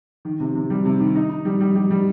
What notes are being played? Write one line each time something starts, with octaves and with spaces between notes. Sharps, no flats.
D#3
C3
C3
G3
C3
D#3
D#4
D#4
G3
G3
G3
G3